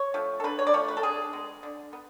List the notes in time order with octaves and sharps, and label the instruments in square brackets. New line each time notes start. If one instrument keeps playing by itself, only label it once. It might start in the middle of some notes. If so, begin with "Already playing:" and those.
Already playing: [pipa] C#5
F3 A3
A4
D3 B4
C#5
D5
F3 A3 C#5
B4
A4
D3 G#4
G#3 B3
D3
B3